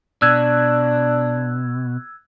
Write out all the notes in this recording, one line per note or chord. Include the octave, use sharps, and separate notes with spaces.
B2 D4 E6 F#6 G#6